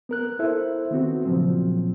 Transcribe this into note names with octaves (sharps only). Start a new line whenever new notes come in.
B3 A#4 F#6
E4 A4 C5 E5
D#3 B3 C4 F#4
A#2 C#3 F3 F#3 C4